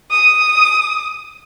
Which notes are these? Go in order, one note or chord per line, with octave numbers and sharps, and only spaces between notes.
D#6